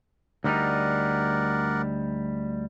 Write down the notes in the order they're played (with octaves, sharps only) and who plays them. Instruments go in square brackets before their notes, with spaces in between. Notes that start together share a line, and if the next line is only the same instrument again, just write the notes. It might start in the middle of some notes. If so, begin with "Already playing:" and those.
[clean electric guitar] D2 G3 D#4 [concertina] A#4 D5 F#5